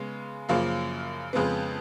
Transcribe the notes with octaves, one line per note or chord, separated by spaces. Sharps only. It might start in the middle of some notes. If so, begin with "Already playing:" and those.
Already playing: C#3 G#3 B3
F#2 C#3 F3 A#3
F2 C#3 G#3 B3